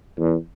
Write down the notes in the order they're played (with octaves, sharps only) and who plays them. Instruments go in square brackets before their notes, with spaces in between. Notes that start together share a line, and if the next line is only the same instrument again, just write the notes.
[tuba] E2